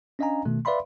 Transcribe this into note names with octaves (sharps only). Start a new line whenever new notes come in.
C#4 D4 D#5 F5 G#5 A#5
B2 D#3 A3
B4 D5 E5 F5 B5 C6